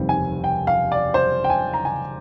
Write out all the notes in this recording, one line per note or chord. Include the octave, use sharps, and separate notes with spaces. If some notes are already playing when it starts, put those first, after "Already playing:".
Already playing: F1 D#2 D#3 G3 C4
G#5
G5
F5
D5
C5
G5
G#5
A#5
G#5